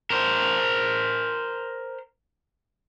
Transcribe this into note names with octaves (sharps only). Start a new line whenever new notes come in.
A#4 C5